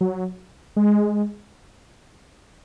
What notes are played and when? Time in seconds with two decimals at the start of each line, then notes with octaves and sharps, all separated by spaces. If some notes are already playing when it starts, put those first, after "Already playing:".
0.01 F#3
0.76 G#3